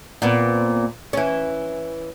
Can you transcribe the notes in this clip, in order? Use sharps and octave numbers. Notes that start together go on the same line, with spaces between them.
A#2 B3 C4
E3 C#4